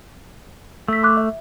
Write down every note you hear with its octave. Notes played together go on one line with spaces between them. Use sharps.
A3 E6 B6
C6 D6 F#6
E5